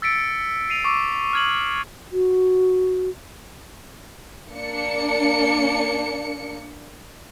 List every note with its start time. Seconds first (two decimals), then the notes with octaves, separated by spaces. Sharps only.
0.02 E6 A6 B6 C#7 D7
0.70 C7 D#7 F7
0.84 C#6 D6 E6 D#7
1.33 F6 G#6 F#7
2.12 F#4
4.53 A#3 D4 C#7